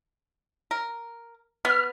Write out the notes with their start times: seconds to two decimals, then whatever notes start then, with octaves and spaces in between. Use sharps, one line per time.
0.71 A#4
1.65 B3 F6